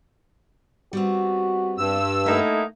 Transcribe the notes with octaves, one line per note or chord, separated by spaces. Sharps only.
G3 B3 C4 F#4
G2 E6
A3 A#3 D#4 E4 E5 F#5